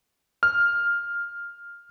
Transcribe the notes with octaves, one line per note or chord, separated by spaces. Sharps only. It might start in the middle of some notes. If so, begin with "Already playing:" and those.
F6